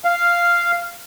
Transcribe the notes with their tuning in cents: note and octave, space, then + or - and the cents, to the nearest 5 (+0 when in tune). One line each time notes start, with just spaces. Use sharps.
F5 -10